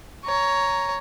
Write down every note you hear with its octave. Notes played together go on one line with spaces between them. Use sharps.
C#5 A#5